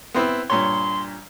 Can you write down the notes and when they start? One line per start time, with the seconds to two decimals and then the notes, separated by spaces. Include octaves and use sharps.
0.14 B3 C4 E4
0.50 G2 A#2 C#5 C6